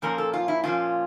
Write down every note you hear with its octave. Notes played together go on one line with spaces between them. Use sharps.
A#2 F3 A#3 C#4 A#4
A4
F4
E4
A#2 F3 A#3 C#4 F4